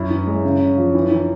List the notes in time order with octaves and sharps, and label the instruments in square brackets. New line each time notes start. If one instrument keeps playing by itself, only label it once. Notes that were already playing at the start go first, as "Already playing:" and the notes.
Already playing: [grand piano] F#2 [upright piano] E4
[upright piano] E3
G#3
C#3
C#3
F3
E3
E3